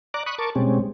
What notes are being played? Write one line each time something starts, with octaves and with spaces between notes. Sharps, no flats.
D5 A#5 D6 F#6
B5 C#6 D#6 F#6
A#4 A5 C#6 D6
B2 G3 G#3 C4 C#4